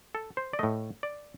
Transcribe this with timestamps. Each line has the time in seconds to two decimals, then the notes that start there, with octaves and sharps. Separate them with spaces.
0.15 A4
0.37 C5
0.53 D5
0.59 A2 A3 D#5
1.03 D5